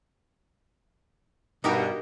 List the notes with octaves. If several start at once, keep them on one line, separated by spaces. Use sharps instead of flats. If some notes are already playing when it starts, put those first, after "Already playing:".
G2 B2 D#4 G4 A#4